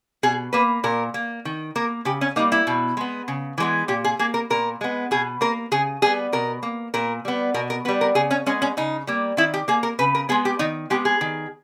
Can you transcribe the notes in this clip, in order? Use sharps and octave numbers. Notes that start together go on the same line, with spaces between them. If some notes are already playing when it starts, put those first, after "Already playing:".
B2 G#4
A#3 B4
A#2 A#4
A#3
D#3
A#3 A#4
C#3 G4
C#4
G3 A#3 D#4
E4
B2
G#3 B3
C#3
E3 G#3 B3
A#2 G4
G#4
A#3 G#4
A#4
A#2 A#4
G#3 B3
B2 G#4
A#3 A#4
C#3 G#4
G3 B3 G#4
B2 A#4
A#3
A#2 A#4
G3 B3
B2 A#4
A#4
G3 B3 B4
A#4
C#3 G#4
C#4
G#3 B3 C#4
C#4
C#3 D#4
G3 A#3
D#3 E4
G4
A#3 G#4
A#4
C#3 B4
A#4
G#3 B3 G#4
G4
D#3 D#4
G#3 B3 G4
G#4
D#3